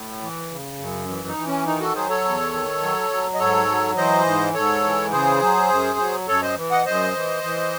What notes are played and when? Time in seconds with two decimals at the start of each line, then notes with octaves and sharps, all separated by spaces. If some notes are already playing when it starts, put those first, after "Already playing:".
Already playing: A2
0.22 E3
0.51 C#3
0.79 F#2
1.08 E3
1.28 D#4
1.37 E3
1.47 C#4
1.66 D#3 D#4
1.80 F#4 A4
1.95 F#3 G#4 C5
2.09 A4 C#5
2.24 E2
2.53 D#3
2.82 F#3
3.10 F#3
3.34 D#5
3.39 G#2 A4 C#5
3.68 F#3
3.97 E3 C5 D#5
4.26 G#2
4.54 G#2 A4 C#5
4.84 E3
5.12 C#3 G#4 C5
5.41 F#3
5.70 F#2
5.99 F#3
6.28 F#2 A4 C#5
6.42 C5 D#5
6.57 E3
6.71 D#5 F#5
6.86 F#2 C5 D#5
7.15 E3
7.44 E3